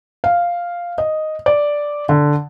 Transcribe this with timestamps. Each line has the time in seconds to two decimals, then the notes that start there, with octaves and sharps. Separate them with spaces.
0.24 F5
0.98 D#5
1.46 D5
2.09 D3